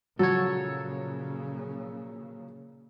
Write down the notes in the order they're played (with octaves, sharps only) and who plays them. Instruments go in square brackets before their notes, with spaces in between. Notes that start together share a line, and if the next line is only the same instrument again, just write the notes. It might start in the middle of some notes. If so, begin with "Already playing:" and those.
[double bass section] A#2 C#3 [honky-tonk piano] F3 F#3 [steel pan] F#4 [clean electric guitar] A4 C#5